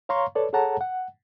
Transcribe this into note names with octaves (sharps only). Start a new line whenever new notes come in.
C#5 F5 A#5 C6 C#6
A4 B4 C#5 D5
G#4 A4 C#5 F#5 A5 A#5
F#5